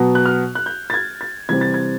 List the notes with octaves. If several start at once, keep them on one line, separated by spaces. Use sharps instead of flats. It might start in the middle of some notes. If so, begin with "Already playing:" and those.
Already playing: B2 F#3 B3
F#6
F6
F#6
G6
A6
G#6
A6
C3 E3 G3 C4 G#6
A6
G#6